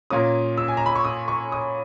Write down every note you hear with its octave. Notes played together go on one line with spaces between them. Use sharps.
A#2 A#3 C#4 D#6
E6
G#5
A#5
B5
C#6
D#6
C#6
D#6